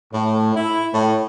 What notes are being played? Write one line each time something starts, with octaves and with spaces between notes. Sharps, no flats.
A2
E4
A2